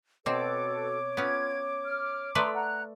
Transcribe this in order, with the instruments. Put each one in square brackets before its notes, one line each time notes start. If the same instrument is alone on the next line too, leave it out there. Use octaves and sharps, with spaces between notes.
[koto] B2 C4 [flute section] F#4 A4 B4 [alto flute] C#5 [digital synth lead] D6
[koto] B3 C#4 [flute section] F4 G#6
[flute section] F6
[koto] A3 B4 D5 [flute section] A#5 C6 D#6
[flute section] F#5 A#5 F#6